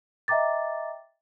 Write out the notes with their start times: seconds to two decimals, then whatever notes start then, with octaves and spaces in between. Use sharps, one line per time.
0.28 D#5 E5 G5 A#5 D6 A6